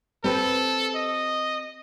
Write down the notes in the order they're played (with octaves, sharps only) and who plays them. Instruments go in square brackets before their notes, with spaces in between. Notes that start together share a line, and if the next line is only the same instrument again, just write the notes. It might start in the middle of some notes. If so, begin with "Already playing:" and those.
[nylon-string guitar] C4 G4 B4 [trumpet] A4
[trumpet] D#5